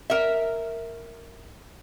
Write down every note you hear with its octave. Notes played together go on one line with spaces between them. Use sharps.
A#4 E5